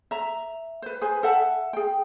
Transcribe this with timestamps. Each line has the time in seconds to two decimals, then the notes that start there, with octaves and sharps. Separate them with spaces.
0.11 E5 A#5
0.82 B4 C5
1.01 G#4 B4 C5 G#5
1.23 A4 E5 F#5 A5
1.73 G#4 G5